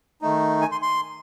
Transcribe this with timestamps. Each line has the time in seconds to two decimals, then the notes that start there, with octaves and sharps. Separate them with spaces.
0.22 D#3 A3 D#4
0.62 G#5
0.72 C6
0.82 C6